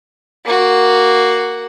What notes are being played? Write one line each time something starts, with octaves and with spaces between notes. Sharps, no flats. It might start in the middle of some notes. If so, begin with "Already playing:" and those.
A#3 F#4